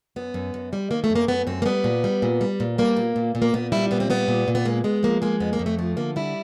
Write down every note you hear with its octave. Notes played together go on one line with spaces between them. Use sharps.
F#2 B3
F#2
F#2
G3
D#3 A#3
A3
F#2
A#3
F#2 B3
F#2 C4
A#3
G3 B3
A#2
G3
A#2
G3
A#2
G3 A#3
A#2
A#2
A#2
A#3
A#2 B3
G3 E4
A#2 B3
C4
G3 B3
A#2
A#2
B3
G#3 A#3
G#3 B3
F3 A#3
G#3 A#3
F2 B3
A#3
F2
A3
F3 A3
D3 A#3
G3 E4